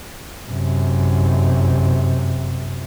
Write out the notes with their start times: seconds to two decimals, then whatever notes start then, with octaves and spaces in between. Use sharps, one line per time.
0.48 F#2 C3